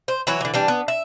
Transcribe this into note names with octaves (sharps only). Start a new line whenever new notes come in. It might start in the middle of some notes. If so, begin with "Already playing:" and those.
C5
E3 F#3 E4 C#5
D3 E3
E3 G3 D4
B3
E5